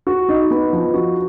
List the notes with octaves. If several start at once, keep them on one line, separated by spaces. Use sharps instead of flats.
F#4
D#4
B3
F3
F#4